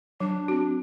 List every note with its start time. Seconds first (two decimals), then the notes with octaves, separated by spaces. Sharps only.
0.20 F#3 D4
0.48 C4 F#4